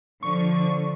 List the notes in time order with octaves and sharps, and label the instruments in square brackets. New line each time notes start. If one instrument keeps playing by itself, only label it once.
[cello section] D3 F3 [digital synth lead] C#6